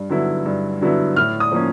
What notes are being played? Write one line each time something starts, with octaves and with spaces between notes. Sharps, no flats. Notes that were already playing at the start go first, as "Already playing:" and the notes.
Already playing: G2
D3 F#3 B3 E4
G2
D3 F#3 B3 E4
A2 F6
D#6
F3 A#3 C#4